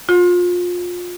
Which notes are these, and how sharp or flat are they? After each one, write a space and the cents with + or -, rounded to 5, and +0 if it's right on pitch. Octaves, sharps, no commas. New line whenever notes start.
F4 +25